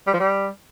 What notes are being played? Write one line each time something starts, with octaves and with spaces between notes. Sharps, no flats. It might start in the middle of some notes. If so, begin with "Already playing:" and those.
G3
F3
G3